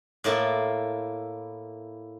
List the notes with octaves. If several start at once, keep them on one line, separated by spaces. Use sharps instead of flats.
A2 A#3 E4 F4